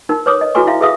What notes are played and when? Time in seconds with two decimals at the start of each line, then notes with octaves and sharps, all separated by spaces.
0.09 D#4 A#4
0.26 B4 C#5 D6 D#6
0.41 D#5
0.55 E4 F#4 A4 B4 G#5 C#6
0.67 E4 E5 F5
0.81 G#4 A4 B4 E5 F5 D#6